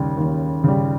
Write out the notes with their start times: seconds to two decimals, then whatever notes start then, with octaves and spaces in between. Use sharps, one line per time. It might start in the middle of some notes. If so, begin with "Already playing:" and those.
Already playing: D#2 C#3 G3
0.17 D#2
0.64 C#3 G3